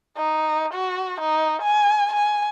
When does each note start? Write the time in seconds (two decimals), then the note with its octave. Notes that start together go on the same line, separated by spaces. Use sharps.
0.17 D#4
0.73 F#4
1.20 D#4
1.62 G#5
2.13 G#5